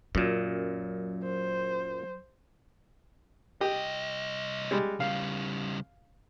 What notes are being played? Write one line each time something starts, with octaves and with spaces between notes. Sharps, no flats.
F#2 A#2 F#3
C5
C2 G4 D#5
G3 G#3
C#3 G3 F5